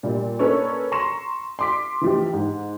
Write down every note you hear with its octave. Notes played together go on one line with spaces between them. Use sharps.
A#2 G3
A#3 C#4 A4 B4 C#5 D5
A#5 C6 C#6 A#6 E7
C6 D6 B6
E3 F3 G4
G#2